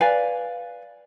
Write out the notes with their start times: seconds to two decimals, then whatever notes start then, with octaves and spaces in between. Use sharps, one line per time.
0.01 B4 D5 F5 G#5